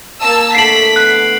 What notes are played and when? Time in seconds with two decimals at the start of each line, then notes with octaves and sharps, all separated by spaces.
0.22 A#3 A5 E6
0.55 D3 A3 B6 C7 D7 F#7
0.96 B3 F#6